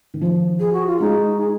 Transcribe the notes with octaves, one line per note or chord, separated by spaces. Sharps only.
D#3
F3
G#4
F#4
F4
G#3 D#4
G#4